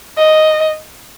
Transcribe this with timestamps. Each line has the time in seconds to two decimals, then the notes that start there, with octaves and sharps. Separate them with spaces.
0.18 D#5